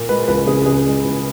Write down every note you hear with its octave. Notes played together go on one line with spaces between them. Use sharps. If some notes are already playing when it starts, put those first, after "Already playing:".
Already playing: A#2
G#3 B4
C#2 B4
C#3 G#4
C#2 G#4
G#3
C#2